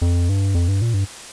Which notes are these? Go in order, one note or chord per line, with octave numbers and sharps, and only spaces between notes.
F2
G2
F2
G2
A#2
G2